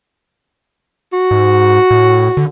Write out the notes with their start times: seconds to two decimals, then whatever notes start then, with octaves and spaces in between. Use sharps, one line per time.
1.13 F#4
1.31 G#2
1.91 A2
2.37 D3